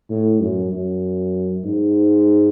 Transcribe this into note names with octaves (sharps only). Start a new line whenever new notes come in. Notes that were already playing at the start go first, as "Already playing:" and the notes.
A2
F#2
F#2
G#2